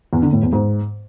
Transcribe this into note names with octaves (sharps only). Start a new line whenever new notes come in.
E2
D3
A2
E2
G#2